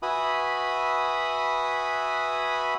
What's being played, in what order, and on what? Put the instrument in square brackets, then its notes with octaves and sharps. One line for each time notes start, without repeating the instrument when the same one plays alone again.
[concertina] F#4 B4 E5 G#5 B5 D#6